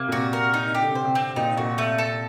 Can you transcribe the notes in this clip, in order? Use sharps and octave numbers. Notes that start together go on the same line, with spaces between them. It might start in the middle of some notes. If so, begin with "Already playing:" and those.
Already playing: C3 A#3
A#2
C3 F#4
A#4
D#4
C3 G4
D3
C3
D3 C5
C3
C4
A#2 D#4
A#2 F#4
A3
A4